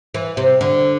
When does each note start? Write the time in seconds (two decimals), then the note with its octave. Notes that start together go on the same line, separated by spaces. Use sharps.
0.14 E3
0.37 C3
0.61 D3